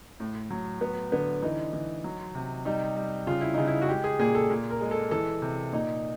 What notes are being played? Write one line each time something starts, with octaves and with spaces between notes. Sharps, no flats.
A2
F#3
F#3 B3
D3 B3
E3 D#4
E3
F#3
C3
G3 D#4
G3
C#3 F4
E4
C#3 D#4
E4
F#4
G#3 G4
G#4
A#2 G#4
A4
A#2
A#4
G#3
A4
E3 A4
C3
A#2 D#4